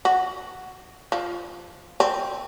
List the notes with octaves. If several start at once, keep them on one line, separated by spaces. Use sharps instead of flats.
F#4
F3
C4